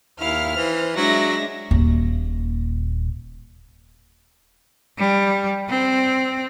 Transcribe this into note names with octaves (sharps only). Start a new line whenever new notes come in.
D#2 E4 F5 F6
E3 C5
F#3 G#3 D4 E5 A#6
D#1 A#2
G3
C4